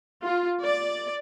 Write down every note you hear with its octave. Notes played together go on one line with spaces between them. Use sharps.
F4
D5